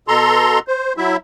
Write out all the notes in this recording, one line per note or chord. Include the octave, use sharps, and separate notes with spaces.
B2 A4 A#5 C6
C5
F#3 E4 E5